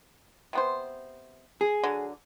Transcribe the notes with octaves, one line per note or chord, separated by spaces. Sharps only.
C3 B3 C5
G#4
D3 F#3